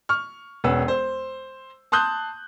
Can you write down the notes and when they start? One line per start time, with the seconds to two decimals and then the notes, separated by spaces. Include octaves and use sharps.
0.09 C#6 F6
0.64 E1 C#4 B4 F#5 E6
0.88 C5
1.92 A5 C6 D#6 F#6 G6